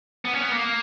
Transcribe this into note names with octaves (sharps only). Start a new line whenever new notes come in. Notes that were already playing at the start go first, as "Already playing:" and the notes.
B3
C#4
B3
A#3